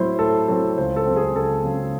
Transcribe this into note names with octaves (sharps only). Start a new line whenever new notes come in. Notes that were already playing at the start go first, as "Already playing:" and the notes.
Already playing: A2 F#3 C4 E4 C5
A2 A4
F#3 C4 E4 A4
C#2 C5
A4
C#3 F#3 C4
G#4
C#2 A4
C#3 F#3 C4